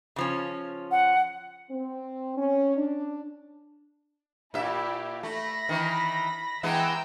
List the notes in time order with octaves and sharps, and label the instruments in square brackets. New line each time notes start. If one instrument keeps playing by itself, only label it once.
[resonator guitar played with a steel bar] C#3 F3 C#4
[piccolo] F#5
[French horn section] C4
C#4
D4
[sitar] A#2 E5 [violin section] E4 G4
[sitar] A3 [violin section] B5 A#6
[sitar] D#3 E3
[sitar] E3 G#3 B3 [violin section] G5 A#5 E6